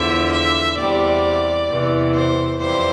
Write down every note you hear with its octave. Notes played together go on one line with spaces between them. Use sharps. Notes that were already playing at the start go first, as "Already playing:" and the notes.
Already playing: E2 D3 F3 E5
E5
E2 C3 G3 D5
E2 C3 E3
C5
F2 E3 G3 C5